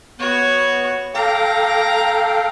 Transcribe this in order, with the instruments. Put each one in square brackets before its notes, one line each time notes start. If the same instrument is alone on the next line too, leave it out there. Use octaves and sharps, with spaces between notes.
[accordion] B3 [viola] F#4 C#5
[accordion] A4 F5 G5 [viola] A#5 D6